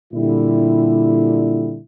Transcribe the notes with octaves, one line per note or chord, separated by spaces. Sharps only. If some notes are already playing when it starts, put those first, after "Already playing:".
A#2 D3 G3 E4